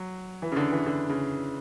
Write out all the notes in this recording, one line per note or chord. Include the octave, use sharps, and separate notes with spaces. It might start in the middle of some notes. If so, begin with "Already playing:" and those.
Already playing: F#3
E3
C#3
D3
E3
D3
C#3